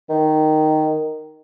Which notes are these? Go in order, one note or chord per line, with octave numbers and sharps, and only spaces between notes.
D#3